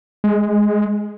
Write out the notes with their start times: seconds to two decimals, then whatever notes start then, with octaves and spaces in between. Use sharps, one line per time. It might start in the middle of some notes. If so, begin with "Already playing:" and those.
0.24 G#3